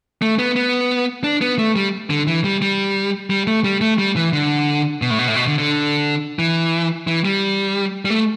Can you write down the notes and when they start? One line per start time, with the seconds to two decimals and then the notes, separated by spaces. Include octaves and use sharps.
0.22 A3
0.39 B3
0.56 B3
1.24 D4
1.41 B3
1.59 A3
1.76 G3
2.10 D3
2.27 E3
2.44 G3
2.62 G3
3.30 G3
3.47 A3
3.64 G3
3.81 A3
3.98 G3
4.16 E3
4.33 D3
5.02 B2
5.10 A2
5.19 B2
5.28 A2
5.36 B2
5.47 D3
5.58 D3
6.39 E3
7.07 E3
7.25 G3
8.05 G3
8.10 A3